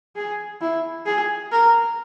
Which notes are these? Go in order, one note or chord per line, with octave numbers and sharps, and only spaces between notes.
G#4
E4
G#4
A#4